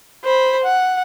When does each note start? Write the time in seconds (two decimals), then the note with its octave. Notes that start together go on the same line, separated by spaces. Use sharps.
0.24 C5 B5
0.64 F#5